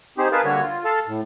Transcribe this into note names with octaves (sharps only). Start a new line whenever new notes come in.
C4 D#4 G4 G#4 C5
G#4 A#4 B4 F5 A5
D3 G3 A#3 F#4 C#5
F4
A4 F5 A5
A2